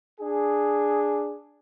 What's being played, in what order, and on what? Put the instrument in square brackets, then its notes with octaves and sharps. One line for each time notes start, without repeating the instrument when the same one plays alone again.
[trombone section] D4 G#4